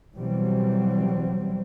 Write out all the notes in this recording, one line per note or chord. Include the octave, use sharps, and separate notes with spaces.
B2 E3 F#3 G3 C4